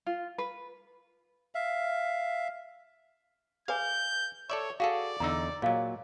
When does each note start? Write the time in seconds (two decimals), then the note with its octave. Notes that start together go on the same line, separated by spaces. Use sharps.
0.07 F4
0.38 B4
1.55 E5 F5
3.68 G#4 B4 F5 G#5 G6
4.50 A4 C#5 D5 E5 C#6
4.80 F#4 G#4 A4 D5 F5
5.20 E2 D3 D#4 A#5 E6
5.62 A#2 F#3 G#4 D#5 F5